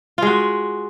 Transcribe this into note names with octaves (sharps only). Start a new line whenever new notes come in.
G#3 F4 F#4